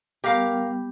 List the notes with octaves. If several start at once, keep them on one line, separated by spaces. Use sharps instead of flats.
G3 B3 G4 A#4 F5 G5 D6